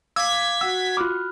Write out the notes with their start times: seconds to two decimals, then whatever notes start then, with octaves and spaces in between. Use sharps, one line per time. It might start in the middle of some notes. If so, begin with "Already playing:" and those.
0.16 F5 D6 E6 G#6 B6
0.61 F#4 F#5 E6
0.97 F4 B5 D6 F6 F#6